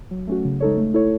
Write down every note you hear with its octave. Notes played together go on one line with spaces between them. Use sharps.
F#3
A3 C#4 F#4
C#3
G#3 D#4 A4 C#5
A3
E4 A4 C#5